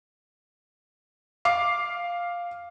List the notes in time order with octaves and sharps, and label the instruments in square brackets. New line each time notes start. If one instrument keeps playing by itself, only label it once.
[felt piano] F5 D6 C7